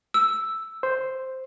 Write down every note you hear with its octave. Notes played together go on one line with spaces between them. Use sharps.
E6
C5